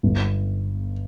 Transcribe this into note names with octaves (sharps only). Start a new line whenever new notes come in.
G1